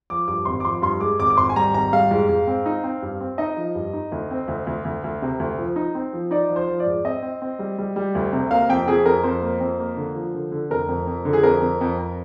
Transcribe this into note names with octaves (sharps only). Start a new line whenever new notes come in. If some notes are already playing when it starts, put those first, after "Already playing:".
F3 D6
G2 D6
G#1 C6
D6
F3 C6
G2 C6
G#3 D6
G#1 D6
D6
G#1 C6
G#5
G3 A#5
G#1 A#5
G3 F5
G#2
G#2
C4
D#4
C4
G2
C4
D#4 D#5
F3
G2
D#4
D2
C4
D2
D2
D2
D2
C3
D2
F3
D#4
C4
F3
D#4 D5
F3
C5
F3
D5
G#2
C4 D#5
C4
C4
G3
G3
G3
D2
C3
A#3 F5
F2 G5
F2 G#4
F2 A#4
F2 C5
A#3
F2
A#3
D3
F3
D3
D3
F1 A#4
F2
F2
D3
G#4
F2 A#4
F2
F2
F2